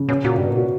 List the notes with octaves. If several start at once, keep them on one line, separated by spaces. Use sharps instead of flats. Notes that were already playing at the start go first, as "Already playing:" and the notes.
Already playing: C#3
B2 C#4
A#2 F#4
G2 B2
A#2
F#4